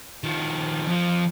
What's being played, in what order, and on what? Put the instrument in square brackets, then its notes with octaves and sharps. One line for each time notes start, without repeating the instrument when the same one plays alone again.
[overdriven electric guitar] D#3 F3
F2 F3